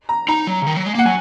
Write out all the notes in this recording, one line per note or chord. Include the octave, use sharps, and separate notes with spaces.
A#5
D#4 A#5
F#3
C#3
D#3
F#3
G#3
A#3 F#5
F#3 G#5